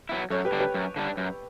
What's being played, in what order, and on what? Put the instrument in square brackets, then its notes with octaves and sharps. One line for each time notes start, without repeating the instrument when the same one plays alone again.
[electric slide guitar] F#3 B3 E4
[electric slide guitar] F#2 [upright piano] A4 C#5
[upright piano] G4 B4
[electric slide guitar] D3 G3 D4
[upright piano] G4 B4
[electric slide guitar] F#2
D3 G3 D4
F#2